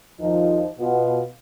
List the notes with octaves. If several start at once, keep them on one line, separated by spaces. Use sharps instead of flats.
D#2 F3 D#4
B2 B3 F4